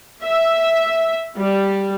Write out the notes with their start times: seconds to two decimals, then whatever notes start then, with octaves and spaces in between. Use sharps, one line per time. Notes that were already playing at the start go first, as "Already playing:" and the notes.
0.24 E5
1.36 G3